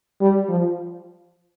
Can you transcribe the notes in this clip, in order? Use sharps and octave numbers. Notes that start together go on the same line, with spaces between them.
G3
F3